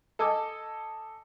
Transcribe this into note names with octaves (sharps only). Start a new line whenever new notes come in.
A4 D#5 G#5 D6 E6